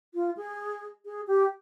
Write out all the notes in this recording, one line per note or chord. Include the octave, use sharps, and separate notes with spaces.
F4
G#4
G#4
G4